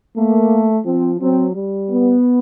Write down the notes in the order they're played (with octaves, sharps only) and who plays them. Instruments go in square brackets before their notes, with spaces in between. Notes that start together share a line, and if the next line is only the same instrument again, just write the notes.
[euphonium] A3 [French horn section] A#3
[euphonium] F3 [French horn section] C4
[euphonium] F#3 [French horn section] C4
[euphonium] G3
[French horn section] B3